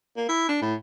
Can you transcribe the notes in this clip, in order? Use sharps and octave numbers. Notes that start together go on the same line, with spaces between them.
A#3
E4
D4
A2